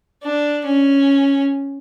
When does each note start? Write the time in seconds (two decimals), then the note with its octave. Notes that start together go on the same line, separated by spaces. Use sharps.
0.23 D4
0.66 C#4